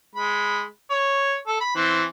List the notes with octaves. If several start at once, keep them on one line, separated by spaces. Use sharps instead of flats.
G#3 B5
C#5
A4
B5
E3 C4